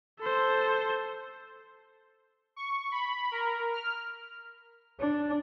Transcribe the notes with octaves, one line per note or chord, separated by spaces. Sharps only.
A4 C5
C#6
B5
A#4
F6
D4